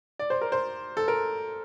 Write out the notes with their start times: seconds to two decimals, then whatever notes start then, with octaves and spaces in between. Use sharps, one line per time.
0.19 D5
0.30 C5
0.41 A#4
0.52 C5
0.97 A4
1.08 A#4